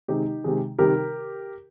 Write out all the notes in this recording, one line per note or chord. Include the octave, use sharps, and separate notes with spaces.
C3 D#3 G#3 D#4 G4
C3 D#3 G#3
C3 D#3 G3 G4 A#4